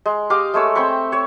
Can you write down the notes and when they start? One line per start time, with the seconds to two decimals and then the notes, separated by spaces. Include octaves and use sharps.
0.06 G#3
0.30 G4 D#5 F5 D6
0.54 G#3 A3 C#5 E6
0.75 C4 G5 B5 C#6
1.12 C#5 E5